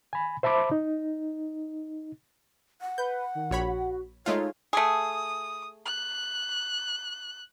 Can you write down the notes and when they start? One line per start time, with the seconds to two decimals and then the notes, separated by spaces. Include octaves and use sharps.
0.13 G#5 B5
0.43 C5 E5 A5 B5 D6
0.71 D#4
2.81 F#5
2.98 B4 G6
3.35 D#3
3.51 A#1 F#4 C#5 B5
4.26 G#3 A3 D#4 F4 C#5
4.73 A3 G#4 D#6
5.85 F#6